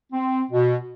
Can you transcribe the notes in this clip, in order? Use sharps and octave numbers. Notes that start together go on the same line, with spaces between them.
C4
B2